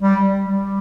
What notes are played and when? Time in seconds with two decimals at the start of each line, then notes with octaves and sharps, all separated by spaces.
0.02 G3
0.43 G3